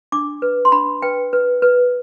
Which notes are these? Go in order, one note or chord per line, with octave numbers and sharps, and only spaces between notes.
D4 D6
B4
C6
D4 B5
B4 G5
B4
B4